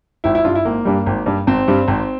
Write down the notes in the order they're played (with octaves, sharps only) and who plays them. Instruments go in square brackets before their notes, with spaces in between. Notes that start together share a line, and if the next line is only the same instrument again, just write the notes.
[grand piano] G#1 E4
E4
G2 G3 F4
E4
G#1 A#3
G2 G3
G#1
G2 G3
G#1 C4
G2 G3
G#1